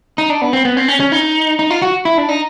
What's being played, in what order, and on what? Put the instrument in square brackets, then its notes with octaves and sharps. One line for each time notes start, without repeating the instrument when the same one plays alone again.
[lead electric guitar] D#4
D4
B3
C4
B3
C4
C#4
C#4
D#4
D#4
F4
F#4
E4
D4
D#4